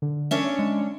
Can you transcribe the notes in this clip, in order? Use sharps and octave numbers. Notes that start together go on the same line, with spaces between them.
D3
C#4 D4 C#5 E5
G#3